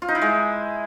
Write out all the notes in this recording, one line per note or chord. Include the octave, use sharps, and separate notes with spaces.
F4
D#4
E4
G#3